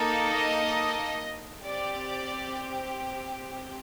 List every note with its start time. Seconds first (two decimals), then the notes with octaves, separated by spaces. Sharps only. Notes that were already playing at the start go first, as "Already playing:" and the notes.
Already playing: A#3 D#4 A4
0.33 D#5
1.64 C4 G4 D5